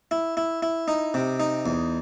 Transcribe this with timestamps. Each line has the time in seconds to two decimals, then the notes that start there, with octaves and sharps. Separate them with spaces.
0.11 E4
0.37 E4
0.63 E4
0.88 D#4
1.14 C3
1.40 D#4
1.66 E2